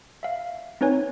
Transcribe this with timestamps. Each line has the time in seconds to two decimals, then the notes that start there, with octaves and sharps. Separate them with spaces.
0.23 E5 F5
0.81 C4 D#4 B4 C#5 G#5